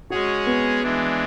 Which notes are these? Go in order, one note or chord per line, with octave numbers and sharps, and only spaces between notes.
G#3 C#4 F#4 G#4 C#5
B3
E3 G#3 D4